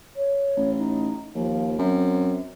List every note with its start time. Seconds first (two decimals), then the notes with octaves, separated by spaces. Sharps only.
0.16 C#5
0.57 A1
0.78 D#4
1.35 D#2 F3
1.78 F#2 C4